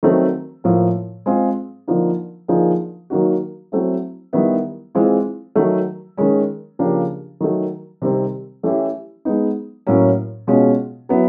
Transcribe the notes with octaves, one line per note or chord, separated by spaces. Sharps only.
D#3 F#3 A3 C4
A2 F3 A#3
G#3 C4 F4 G#4
D3 F3 A#3 D#4
D3 F3 A#3 D#4 G#4
D#3 F#3 A#3 D#4 F#4
F#3 A3 C4 E4
D#3 G3 B3 E4
E3 G#3 C4 F4
D#3 F#3 A3
D#3 G#3 C#4
C#3 F3 A#3 D4 G4
D#3 F#3 A3
C3 D#3 G3 C4
E3 A3 C#4 E4 G4
G#3 B3 D#4
A2 F#3 A#3 C#4
B2 G#3 C#4 F4
F#3 B3 E4